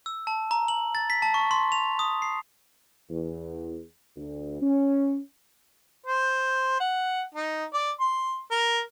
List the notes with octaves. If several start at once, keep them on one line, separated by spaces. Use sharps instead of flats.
E6
A5
A#5
F#7
A6
B6
A5
C#6
C6
F7
D#6
C7
E2
D2
C#4
C5
F#5
D#4
D5
C6
A#4